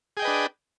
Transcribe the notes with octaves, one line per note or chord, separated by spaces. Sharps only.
D4 G#4 B4 D#5 G5